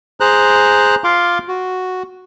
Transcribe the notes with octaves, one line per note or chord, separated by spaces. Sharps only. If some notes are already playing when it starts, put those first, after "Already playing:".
G#4 C5 A#5 F#6
F4 F5 C6 D6
F#4